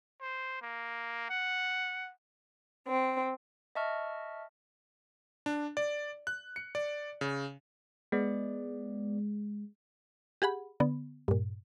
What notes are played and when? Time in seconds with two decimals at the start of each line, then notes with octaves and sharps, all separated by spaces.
0.21 C5
0.62 A#3
1.30 F#5
2.88 C4
3.75 D#5 E5 A5 C#6 F6
5.46 D4
5.77 D5
6.27 F#6
6.56 C#7
6.75 D5
7.21 C#3
8.12 G#3 B3 D5
10.42 G4 G#4 F#5 B5
10.80 D3 B3
11.28 G2 A#2